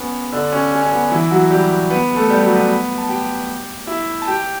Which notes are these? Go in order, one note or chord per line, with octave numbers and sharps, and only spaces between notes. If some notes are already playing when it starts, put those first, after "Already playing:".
Already playing: B3 C#4
D3 D4
C#4
C#4
C#4
B3
E3 E4
F#3 F#4
G3 G4
B3 B4
B4
A3 A4
G3 G4
F#3 F#4
B3 B4
A5
G4 G5
E4 E5
A5
G4 G5